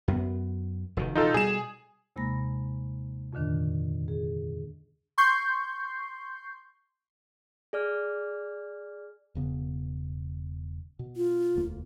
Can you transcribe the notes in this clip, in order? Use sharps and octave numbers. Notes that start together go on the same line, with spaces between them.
F#2 B3
F1 B2 D#3
B2 E3 D#4 F4 A4
B2 G3 G#4 E7
D#2 C3 G#3 A#3 B5 A#6
F2 A#2 D3 D#3 D4
G#4
C6 C#6 G6 C7
G#4 D5 F6
E1 C#3 B3
B2
F4
E1 D2 A#3